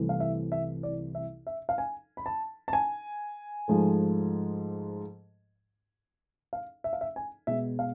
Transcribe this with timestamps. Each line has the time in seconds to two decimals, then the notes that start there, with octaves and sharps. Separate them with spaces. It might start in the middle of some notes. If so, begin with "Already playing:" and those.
Already playing: C2 C3 E3 A3
0.09 F5
0.20 E5
0.52 E5
0.83 D5
1.15 E5
1.47 E5
1.69 F5
1.78 G#5
2.17 B5
2.26 A5
2.68 A5
2.73 G#5
3.68 G#2 F3 A3
6.53 F5
6.84 E5
6.93 F5
7.01 E5
7.16 G#5
7.47 B2 G#3 B3 E5
7.79 F5